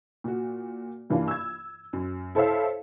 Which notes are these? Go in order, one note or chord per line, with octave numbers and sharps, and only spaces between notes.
A#2 F#4
G2 E3 A#3 D4 F4
E6 G#6
F#2
E4 A4 C5 C#5 E5 F5